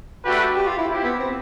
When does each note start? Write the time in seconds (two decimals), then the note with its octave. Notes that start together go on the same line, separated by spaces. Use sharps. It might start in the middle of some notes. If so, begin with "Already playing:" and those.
0.25 A3 D4 F#4 G4 B4
0.56 G4
0.67 F4
0.78 E4
0.89 C4 E4 G4
1.04 B3
1.19 C4